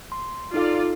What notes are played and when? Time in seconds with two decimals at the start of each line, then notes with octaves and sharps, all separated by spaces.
0.12 C6
0.54 D#4 F4 A4 D5 F5